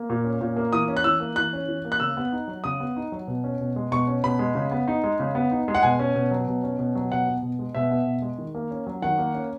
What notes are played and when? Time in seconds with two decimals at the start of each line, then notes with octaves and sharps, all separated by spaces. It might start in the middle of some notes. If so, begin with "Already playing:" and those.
Already playing: A#3
0.10 A#2
0.24 C#4
0.41 A#2
0.56 A#3
0.72 E3 D#6
0.88 C#4
0.97 F#6
1.04 E3 E6
1.20 A#3
1.36 E3 F#6
1.53 C#4
1.68 E3
1.85 A#3
1.92 F#6
2.00 C#3 E6
2.17 B3
2.32 D#4
2.48 F#3
2.64 C#3 D#6
2.80 B3
2.96 D#4
3.12 F#3
3.27 B2
3.44 C#4
3.61 B2
3.76 G#3
3.91 B2 C#6
4.08 C#4
4.24 B2 B5
4.39 G#3
4.55 C#3
4.71 B3
4.88 D#4
5.04 G#3
5.20 C#3
5.35 B3
5.51 D#4
5.68 G#3
5.75 F#5
5.83 B2 G#5
5.99 C#4
6.15 B2
6.31 F#3
6.48 B2
6.63 C#4
6.79 B2
6.95 F#3
7.11 B2 F#5
7.27 B3
7.42 B2
7.59 G#3
7.75 B2 E5
7.91 B3
8.06 B2
8.22 G#3
8.38 D#3
8.55 A#3
8.71 C#4
8.87 F#3
9.02 D#3 F#5
9.18 A#3
9.34 C#4